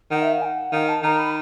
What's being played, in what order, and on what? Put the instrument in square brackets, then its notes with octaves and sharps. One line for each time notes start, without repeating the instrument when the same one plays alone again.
[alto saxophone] D#3 [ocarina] F#5
[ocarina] E5
F5
G#5
F#5
[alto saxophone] D#3 [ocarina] F5
[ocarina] A5
[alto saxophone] D#3 [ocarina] A#5
[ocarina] B5